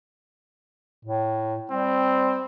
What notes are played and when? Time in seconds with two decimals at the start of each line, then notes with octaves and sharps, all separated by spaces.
1.05 A2
1.71 G3 C4